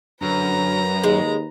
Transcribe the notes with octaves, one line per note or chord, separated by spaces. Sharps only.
F#2 D3 B4 A#5
D#2 G#3